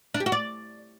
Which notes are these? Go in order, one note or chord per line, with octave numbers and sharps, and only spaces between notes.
D4
G4
F#4
D5